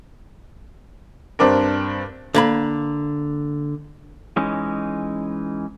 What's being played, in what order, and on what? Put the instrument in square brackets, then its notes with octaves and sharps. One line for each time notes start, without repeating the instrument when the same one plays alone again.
[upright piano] G2 C4 D4 A#4
[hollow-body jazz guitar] D3 A#3 B5
[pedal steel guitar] E3 G#3 C#4 D#4